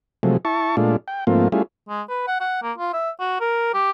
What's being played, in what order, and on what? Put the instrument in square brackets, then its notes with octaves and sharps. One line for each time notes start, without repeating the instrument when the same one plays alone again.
[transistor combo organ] C3 F3 F#3 G#3 A3
E4 A5 C#6
A#2 G#3 A3 D4 F4
G5
G#2 F3 A3 A#3 C4 F4
G3 A3 C#4 E4 F4 G#4
[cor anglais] G#3
B4
F#5
F#5
A#3
F4
E5
F#4
A#4
G4